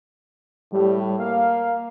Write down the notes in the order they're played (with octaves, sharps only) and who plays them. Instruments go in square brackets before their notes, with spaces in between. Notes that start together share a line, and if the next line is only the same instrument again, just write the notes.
[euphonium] A2 [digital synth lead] G3
[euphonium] A#3 [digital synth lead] F5